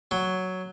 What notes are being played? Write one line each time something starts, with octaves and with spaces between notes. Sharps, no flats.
F#3